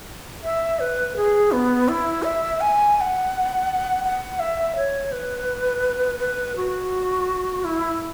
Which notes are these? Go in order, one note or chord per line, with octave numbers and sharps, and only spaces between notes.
E5
B4
G#4
B3
E4
E5
G#5
G#5
F#5
F#5
E5
C#5
B4
B4
F#4
E4